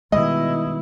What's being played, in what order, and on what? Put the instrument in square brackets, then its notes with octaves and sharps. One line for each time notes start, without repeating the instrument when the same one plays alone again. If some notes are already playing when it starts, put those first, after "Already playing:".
[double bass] B2 E4 [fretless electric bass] D#3 G3 G#3 [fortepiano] D#5